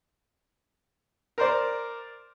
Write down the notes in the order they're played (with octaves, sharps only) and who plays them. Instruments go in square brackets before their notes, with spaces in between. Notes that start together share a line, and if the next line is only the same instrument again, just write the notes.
[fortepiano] A#4 C5 D5